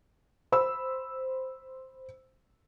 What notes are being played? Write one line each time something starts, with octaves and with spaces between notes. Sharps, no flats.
C5 B5 E6